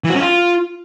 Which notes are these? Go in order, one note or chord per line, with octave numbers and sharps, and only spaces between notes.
E3
F#4
C#4
F4